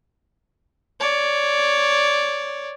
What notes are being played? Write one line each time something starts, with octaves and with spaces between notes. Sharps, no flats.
C#5 D5